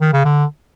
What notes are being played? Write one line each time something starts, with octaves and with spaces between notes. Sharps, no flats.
D#3
C#3
D3